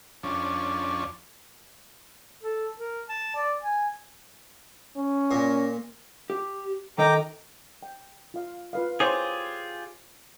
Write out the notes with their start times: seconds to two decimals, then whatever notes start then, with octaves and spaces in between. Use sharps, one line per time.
0.23 F2 C#4 D4
2.43 A4
2.79 A#4
3.09 A5
3.36 D5
3.61 G#5
4.97 C#4
5.31 A#2
6.30 G4
6.98 D#3 A4 D#5 G5 A#5 D6
7.83 G5
8.34 F4 F5
8.73 F4 B4 F5
9.00 E4 F4 G4 G#4 C5 C#5